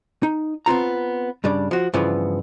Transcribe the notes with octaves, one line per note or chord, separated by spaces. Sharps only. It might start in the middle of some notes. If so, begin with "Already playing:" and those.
D#4
B3 C4 F4 A#5
G2 C#3 G3 D4
F3 F#4
G2 C#3 E3 F3 B3